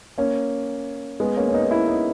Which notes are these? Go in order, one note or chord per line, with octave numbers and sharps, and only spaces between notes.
A#3 C#4
G#3 B3
A#3 C#4
C#4
B3 D#4
D#4
C#4 E4
B3 D#4